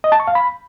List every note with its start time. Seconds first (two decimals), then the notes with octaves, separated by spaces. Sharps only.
0.04 D#5
0.12 A5
0.20 C#6
0.27 F5
0.35 B5